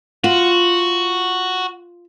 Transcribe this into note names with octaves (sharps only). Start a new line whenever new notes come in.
F4 F#4